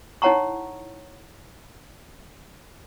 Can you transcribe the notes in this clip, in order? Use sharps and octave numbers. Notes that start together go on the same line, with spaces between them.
D#4 E4 C#5 F#5 A#5 C#6